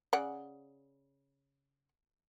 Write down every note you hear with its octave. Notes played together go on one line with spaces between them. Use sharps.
C#3 D5 F#5